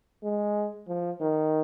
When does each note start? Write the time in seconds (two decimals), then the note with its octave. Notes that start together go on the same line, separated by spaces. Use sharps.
0.23 G#3
0.88 F3
1.21 D#3